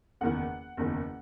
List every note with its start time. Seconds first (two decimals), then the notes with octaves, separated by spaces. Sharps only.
0.21 F#1 E2 D#3 F#5
0.77 F#1 E2 D#3